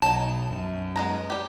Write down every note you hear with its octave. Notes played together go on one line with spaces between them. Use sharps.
B1 F#3 D#4 A5
F#2
G#3 B3 A#5
G3 G4